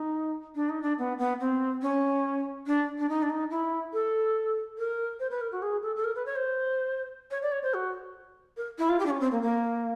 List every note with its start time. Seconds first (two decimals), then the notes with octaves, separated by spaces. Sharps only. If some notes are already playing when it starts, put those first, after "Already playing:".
Already playing: D#4
0.55 D4
0.69 D#4
0.82 D4
0.98 B3
1.19 B3
1.40 C4
1.82 C#4
2.67 D4
2.98 D4
3.09 D#4
3.22 D4
3.29 D#4
3.50 E4
3.93 A4
4.78 A#4
5.20 C5
5.30 B4
5.41 A#4
5.52 F#4
5.62 G#4
5.83 A4
5.96 A4
6.04 A#4
6.15 B4
6.26 C#5
6.36 C5
7.31 C#5
7.42 D5
7.52 C#5
7.63 C5
7.74 F#4
8.57 A#4
8.78 E4
8.89 F4
8.99 G4
9.06 D4
9.10 C#4
9.20 C4
9.32 A#3
9.42 A#3